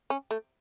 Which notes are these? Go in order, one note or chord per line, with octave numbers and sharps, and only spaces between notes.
C#4
A3